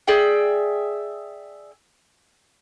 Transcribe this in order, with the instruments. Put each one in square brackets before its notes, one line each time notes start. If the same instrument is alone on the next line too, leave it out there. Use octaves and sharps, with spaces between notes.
[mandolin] G#4 D5 E5 G5